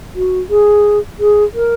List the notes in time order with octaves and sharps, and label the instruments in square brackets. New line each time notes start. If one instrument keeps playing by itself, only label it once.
[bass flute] F#4
G#4
G#4
A#4